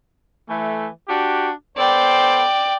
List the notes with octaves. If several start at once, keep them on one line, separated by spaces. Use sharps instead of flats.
E3 A3
D4 F#4 G4
B3 A4 C5 D5 G5